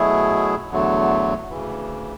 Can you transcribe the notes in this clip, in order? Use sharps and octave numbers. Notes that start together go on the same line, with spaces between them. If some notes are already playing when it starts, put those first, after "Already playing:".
Already playing: B2 F#3 A3 E4 G#4
E2 D3 F#3 A3
D2 C#3 E3